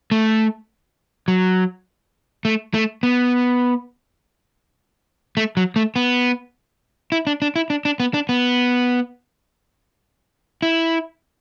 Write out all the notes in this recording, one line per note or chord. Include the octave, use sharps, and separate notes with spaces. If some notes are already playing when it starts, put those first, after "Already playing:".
A3
F#3
A3
A3
B3
A3
F#3
A3
B3
E4
D4
D4
E4
D4
D4
B3
D4
B3
E4